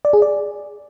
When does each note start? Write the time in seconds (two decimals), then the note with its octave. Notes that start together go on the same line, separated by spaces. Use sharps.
0.05 D5
0.13 G#4
0.22 D5